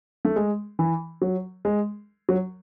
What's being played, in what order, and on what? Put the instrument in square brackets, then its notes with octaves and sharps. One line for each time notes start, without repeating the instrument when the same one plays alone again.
[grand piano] A3
G#3
E3
F#3
G#3
F#3